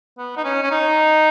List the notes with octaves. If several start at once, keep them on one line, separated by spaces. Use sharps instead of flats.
B3
D#4
C#4
C#4
D#4